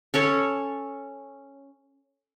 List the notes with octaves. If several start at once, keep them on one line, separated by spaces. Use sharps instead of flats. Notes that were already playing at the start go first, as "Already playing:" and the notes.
C#4 A4 C#5